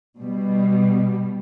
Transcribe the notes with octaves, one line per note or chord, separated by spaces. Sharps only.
B2 G3